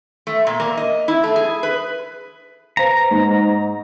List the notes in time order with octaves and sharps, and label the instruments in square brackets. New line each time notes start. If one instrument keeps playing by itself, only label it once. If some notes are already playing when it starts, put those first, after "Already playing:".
[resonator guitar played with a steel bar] A3
A#2
A#3
D#5
E4
A3
G#4
B4
[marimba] B4 C5 F5 [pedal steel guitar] A#5
[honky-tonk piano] G#2 [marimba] G#3